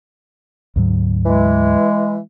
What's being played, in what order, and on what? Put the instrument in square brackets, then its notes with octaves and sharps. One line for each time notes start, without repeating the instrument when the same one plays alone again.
[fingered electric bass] D2 G#2 F#3
[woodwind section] E3 G#3